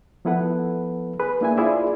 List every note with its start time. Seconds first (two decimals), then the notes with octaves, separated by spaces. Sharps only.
0.25 F3 B3 E4 A4 B4 F#5
1.19 G#4 B4 B5
1.41 A#3 D4 E4 G#4 E5 G#5
1.58 E4 F4 G#4 C5 D5 E5